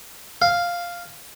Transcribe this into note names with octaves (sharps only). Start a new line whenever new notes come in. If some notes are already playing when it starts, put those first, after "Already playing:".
F5